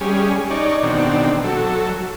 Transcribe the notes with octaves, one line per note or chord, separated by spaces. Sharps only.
G3 C#4 G#4
D#4 C#5 D5
B2 D#3 C4 D4
F#3 A4